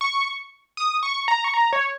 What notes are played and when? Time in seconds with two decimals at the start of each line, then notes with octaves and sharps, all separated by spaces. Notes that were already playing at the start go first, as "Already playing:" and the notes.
0.01 C#6
0.77 D#6
1.03 C#6
1.28 A#5
1.44 C#6
1.54 A#5
1.73 C#5